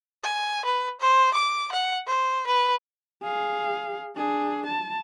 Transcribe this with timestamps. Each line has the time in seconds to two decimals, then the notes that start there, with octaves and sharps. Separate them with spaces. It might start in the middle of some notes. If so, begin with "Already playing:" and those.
0.23 G#5
0.65 B4
1.00 C5
1.34 D6
1.72 F#5
2.06 C5
2.46 B4
3.22 G#4 F5
4.16 D4 G#4
4.67 A5